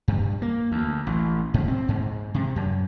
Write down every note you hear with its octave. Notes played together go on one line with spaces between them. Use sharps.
G2
A#3
D2
A1
G#2
C4
G#2
C3
F#2